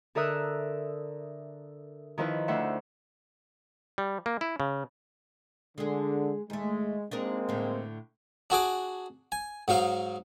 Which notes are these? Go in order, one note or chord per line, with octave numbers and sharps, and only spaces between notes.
D3 A4 A#4 E5 D#6 F#6
D#3 F3 E4 B4
D2 C5 E5 F#5
G3
A#3
E4
C#3
D3 G#3 G#4
D#2 G#3 A3
G#3 A#3 C4 D4 D#4 A#4
A2 D3
D4 F#4 G#4 D6
G#5
G#2 F#3 D#4 F5